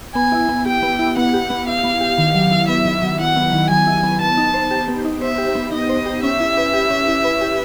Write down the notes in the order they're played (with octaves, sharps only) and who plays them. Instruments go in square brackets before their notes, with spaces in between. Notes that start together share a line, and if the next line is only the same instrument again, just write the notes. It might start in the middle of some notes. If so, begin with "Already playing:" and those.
[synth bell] B3 [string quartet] G#5
[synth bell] E4
B3
[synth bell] G4 [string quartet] G5
[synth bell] B3
E4
[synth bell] B3 [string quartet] F#5
[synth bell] G4
B3
[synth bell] E4 [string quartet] F5
[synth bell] B3
G4
D#3
F#3
E4
[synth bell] B3 [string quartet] E5
[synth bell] D#3
F#3
[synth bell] E4 [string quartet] F#5
[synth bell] B3
D#3
[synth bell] F#3 [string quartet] G#5
[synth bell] E4
B3
[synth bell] B3 [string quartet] A5
[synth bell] D#4
C5
G4
B3
D#4
[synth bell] C5 [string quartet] E5
[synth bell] G4
B3
[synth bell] D#4 [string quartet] D#5
[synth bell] C5
G4
[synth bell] C#4 [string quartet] E5
[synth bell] E4
B4
G4
C#4
E4
B4
G4